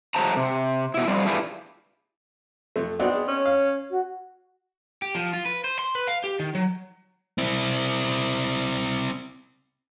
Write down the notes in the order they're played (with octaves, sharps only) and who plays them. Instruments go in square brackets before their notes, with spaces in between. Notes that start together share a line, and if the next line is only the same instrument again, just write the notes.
[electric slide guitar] F#3 G#3 A3 C5 A5 A#5
C3
B2 E4
F2 G3 C4
D4 E4 F4 G4 G#4 B4
[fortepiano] F2 A3
[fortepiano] B3 C4 D#4 [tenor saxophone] D4 [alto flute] F#4
[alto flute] G#4
[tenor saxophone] C#4 [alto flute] C#5
[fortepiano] F5
[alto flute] F#4
[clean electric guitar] G4
F3
F4
B4
C5
C6
B4
F5
G4
D#3
F#3
[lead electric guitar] C4 E4